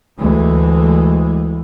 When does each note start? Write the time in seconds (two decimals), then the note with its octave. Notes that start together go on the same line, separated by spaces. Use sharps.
0.17 D2 E3 G#3